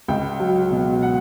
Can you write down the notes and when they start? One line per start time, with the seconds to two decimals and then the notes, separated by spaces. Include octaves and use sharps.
0.08 C#2 G5
0.40 F#3
0.71 B2
1.02 F#5